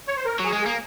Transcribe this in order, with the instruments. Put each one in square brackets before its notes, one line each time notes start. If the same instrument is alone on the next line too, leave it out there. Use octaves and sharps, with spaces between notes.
[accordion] C#5
C5
A#4
[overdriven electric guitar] F#3 [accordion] G#4
[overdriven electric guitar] G#3
[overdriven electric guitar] A#3 [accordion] G#4